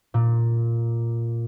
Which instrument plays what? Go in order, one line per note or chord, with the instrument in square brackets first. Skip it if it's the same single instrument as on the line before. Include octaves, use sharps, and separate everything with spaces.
[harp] A#2